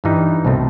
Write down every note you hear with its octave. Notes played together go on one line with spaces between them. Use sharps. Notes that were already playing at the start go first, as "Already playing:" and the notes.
G2 E3 G3 D#4
C2 B2 A3 C4